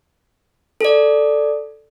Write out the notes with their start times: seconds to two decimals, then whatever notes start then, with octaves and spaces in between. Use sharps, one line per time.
0.81 A4 D5